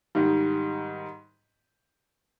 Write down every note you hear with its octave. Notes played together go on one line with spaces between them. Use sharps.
G#2 D#3 G3